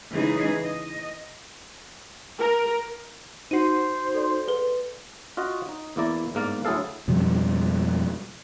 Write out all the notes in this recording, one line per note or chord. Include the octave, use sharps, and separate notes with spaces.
C#3 E3 G#3 D#4 G#4
D#5
A#4
D#4 F#4 C5 C7 D#7
A4 D5 C6
G#4 B4 G7
F4 F#4 D#5
D#4
E2 A#3 E4 D5 A#5
G1 G#2 A#3 A#4 D5
D2 F#3 E4 G#4 A4 F5
F2 B2 F3 G3